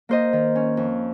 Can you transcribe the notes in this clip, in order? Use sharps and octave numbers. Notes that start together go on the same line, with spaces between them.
A#3 C5 D#5
D#3
C#4
F2